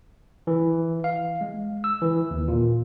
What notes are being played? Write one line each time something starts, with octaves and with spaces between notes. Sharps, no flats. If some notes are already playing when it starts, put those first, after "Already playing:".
E3
F5
G#3
E6
E3
D#2
A#2